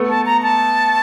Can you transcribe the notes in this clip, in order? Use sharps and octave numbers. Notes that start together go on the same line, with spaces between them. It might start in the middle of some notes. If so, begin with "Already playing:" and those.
Already playing: A3 B3
A5
A#5
A5